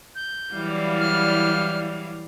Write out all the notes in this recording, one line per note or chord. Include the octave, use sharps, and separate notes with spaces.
G6
E3 F#3 G3 E4 D5 F5
F6